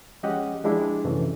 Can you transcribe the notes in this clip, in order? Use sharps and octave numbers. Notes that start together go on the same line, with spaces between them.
F3 G#3 C#4 G4 D#5 F#5
F3 G#3 D4 E4 G4
F#2 C3 E3 A3